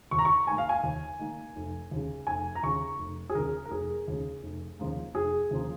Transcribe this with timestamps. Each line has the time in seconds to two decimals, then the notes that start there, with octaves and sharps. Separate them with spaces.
0.11 D#2 C#6
0.19 A#5
0.25 C#6
0.47 D#3 A#3 G#5
0.58 F5
0.69 G#5
0.83 D#2
1.19 D#3 A#3
1.56 F1
1.91 D#2 C#3
2.27 F1 G#5
2.55 A#5
2.63 D#2 C#3 C#6
2.99 F1
3.29 G#4
3.35 D#2 C#3 A#4
3.65 A#4
3.71 F1 G#4
4.08 D#2 C#3
4.43 F1
4.79 D#2 C#3 F3 A#3
5.14 F1 G#4
5.51 D#2 C#3 F3 A#3